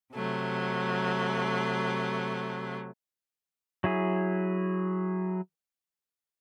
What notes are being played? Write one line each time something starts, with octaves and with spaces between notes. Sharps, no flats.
C3 F#3 A3
F#3 E4 G#4